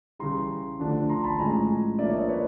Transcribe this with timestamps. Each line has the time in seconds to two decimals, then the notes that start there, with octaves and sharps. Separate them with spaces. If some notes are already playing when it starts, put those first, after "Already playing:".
0.19 C#3 E3 G3 A#5 C6
0.79 D3 F3 A3 D4
1.09 A#5 C6
1.24 A5 B5
1.39 A2 F3 G#3 C#4 G#5 A#5
1.99 F3 A#3 D4 D5 E5
2.09 C#5 D#5
2.19 C5 D5
2.29 B4 C#5